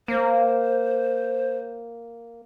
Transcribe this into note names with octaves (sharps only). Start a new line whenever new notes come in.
A#3 C5